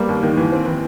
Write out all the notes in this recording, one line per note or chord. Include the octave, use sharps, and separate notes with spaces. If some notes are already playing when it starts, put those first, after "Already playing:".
Already playing: G3 A#3 B3
D#2
D#3
E3
C4
E3